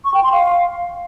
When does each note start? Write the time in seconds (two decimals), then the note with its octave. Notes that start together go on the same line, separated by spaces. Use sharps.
0.05 C#6
0.14 G5
0.23 C6
0.33 F5